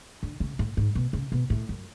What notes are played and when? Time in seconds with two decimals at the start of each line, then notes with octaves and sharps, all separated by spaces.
0.23 D3
0.40 C#3
0.59 A2
0.77 G#2
0.95 B2
1.13 C#3
1.32 B2
1.50 A2
1.69 F#2